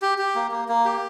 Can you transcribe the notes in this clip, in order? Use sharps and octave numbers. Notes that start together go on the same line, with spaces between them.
G4
G4
A#3
A#3
A#3
G4